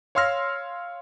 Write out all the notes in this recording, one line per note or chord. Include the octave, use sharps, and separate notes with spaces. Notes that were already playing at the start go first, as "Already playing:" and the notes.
C#5 F5 C6 E6 F6 A#6